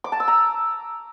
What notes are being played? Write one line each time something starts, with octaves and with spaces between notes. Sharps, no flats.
D6
A5
E6
A#5